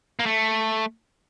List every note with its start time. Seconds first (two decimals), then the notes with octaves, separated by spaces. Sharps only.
0.19 A#3
0.26 A3